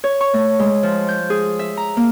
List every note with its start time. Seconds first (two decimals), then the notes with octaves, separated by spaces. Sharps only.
0.04 C#5
0.21 C#6
0.34 A3
0.59 G#3
0.83 F3
1.09 G6
1.30 G#4
1.59 E5
1.77 A#5
1.97 A#3